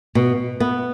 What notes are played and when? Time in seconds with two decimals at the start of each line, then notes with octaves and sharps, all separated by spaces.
0.15 B2
0.60 B3